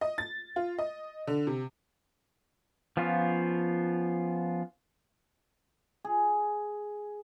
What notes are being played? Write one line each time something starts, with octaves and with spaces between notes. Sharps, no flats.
D#5
A6
F4
D#5
D3
C3
F3 B3 C#4 F4
G#4